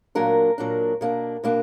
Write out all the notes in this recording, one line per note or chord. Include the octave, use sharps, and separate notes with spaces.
A#2 F#3 A#3 D4 A#4
A#2 F#3 A#3 D4
B2 A#3 D4
B2 A#3 D4